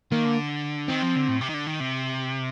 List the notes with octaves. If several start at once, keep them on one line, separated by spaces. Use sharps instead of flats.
D#3 A#3
D3
D#3 C4
F3
D3
A2
C3
D#3
D3
D#3
C3